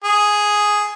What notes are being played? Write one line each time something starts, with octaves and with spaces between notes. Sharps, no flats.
G#4